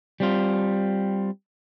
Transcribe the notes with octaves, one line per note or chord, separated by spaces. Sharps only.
G3 C4 F4